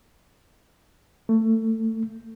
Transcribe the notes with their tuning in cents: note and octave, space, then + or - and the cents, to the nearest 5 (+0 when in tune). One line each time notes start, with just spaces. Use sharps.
A3 +25